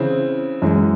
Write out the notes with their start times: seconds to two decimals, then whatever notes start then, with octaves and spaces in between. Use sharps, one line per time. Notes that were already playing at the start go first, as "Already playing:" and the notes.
Already playing: C#3 E3 C4 E4
0.62 F#2 E3 G#3